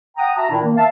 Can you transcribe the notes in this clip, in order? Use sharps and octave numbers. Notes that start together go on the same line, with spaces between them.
F#5 G5 A#5 D#6
F#4 E5 A5 A#5
A#2 D#3 D4 E4
D#3 A#3
E5 F5 A5